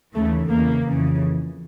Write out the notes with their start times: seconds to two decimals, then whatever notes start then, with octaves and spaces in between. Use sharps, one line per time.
0.14 D#2 C#3 E3 A3
0.50 E2 C#3 E3 A#3
0.86 F2 C#3 E3